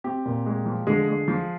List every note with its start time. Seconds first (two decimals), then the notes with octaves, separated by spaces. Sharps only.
0.04 C4 G4
0.26 A#2
0.46 G#3
0.66 F3
0.87 D3 G#3 G#4
1.08 G#3
1.28 F3